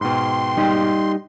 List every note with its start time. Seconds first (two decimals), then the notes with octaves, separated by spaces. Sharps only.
0.01 G#2 B2 G5 C6
0.57 G3 D#4 G4